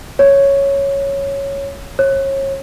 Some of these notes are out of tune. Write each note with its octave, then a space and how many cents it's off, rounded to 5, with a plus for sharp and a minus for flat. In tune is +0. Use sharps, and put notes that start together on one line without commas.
C#5 +0
C#5 -30